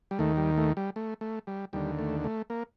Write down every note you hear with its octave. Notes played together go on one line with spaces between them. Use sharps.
G3
D#2 D#3 A3
G3
A3
G3
A3
A3
G3
D#2 D3 G3
A3
A3
A#3